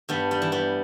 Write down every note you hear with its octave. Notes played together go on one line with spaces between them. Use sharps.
G2 G3 B3
G3
E3
G3 B3